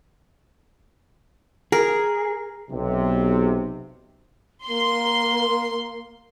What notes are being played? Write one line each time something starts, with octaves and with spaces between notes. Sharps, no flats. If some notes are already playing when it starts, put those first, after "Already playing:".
G#4 A#4
B1 C3
A#3 C6